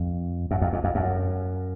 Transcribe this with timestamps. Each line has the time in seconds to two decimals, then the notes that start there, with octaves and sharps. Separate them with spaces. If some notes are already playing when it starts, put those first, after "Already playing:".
Already playing: F2
0.51 F#2
0.61 F2
0.73 F2
0.84 F2
0.95 F#2